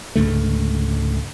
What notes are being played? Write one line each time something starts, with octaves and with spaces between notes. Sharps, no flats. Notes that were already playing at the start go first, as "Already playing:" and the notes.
C#2 G#2 D3 A3